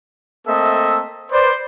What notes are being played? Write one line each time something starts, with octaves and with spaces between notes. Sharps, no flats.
A3 A#3 C4 A4 D#5 E5
B4 C5 D5